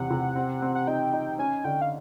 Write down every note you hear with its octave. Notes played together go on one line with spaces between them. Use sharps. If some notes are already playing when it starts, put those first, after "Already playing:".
Already playing: E2 C3 F#5
C3
C4
C4
F#5
D#4 G5
D#4
C#4 G#5
D3 G5
F5